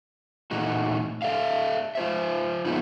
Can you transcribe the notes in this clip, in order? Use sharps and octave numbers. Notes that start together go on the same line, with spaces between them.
A#2 E3 A3 D#4 F#4
A4 D5 E5 F5
F4 C5 E5
F3 G#3 A#3 B3 D#4 E4